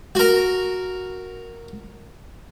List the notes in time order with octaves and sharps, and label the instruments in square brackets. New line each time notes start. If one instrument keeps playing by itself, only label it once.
[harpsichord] F#4 A#4